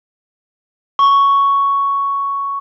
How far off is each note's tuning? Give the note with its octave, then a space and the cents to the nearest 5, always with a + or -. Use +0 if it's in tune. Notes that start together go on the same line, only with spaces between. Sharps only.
C#6 +5